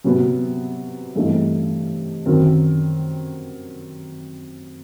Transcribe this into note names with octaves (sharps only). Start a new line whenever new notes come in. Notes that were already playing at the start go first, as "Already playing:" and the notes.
C3 F#3 B3
G2 E3 A3 C4 D#4
F#2 D#3 F#3 C4